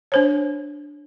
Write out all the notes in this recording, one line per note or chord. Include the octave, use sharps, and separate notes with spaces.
D4 C5 C#5